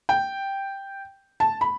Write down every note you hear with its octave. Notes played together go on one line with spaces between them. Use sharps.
G5
A5
B5